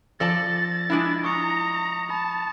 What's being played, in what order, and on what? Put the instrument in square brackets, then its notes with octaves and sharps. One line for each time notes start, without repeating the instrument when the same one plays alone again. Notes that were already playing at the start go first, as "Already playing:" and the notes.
[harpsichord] F3 [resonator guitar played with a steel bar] A4 D5 A5 [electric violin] A6 [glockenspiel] A#6
[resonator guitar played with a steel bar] G#3 D4 E4
[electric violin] A#5 [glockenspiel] C#6 D#6 C#7
[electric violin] A5 [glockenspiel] B5